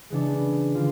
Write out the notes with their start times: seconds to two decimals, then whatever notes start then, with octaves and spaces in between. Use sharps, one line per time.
0.10 C#3 E3 G#3 B3 D4
0.75 D3 F3 F4